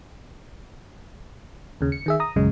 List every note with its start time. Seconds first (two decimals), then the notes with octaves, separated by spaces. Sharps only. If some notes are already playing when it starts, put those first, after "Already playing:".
1.81 D#2 C#3
1.92 C#7
2.06 D#3 G#4 E5
2.20 A#5 D#6
2.36 A#1 F#2 C#3 G#3